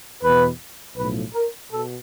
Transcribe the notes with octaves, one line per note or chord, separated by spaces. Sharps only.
E2 B2 B4
B1 A2 F3 B4
A#4
B2 A4